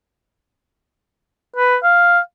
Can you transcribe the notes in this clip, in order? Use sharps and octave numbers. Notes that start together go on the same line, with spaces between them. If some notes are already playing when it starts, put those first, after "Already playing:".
B4
F5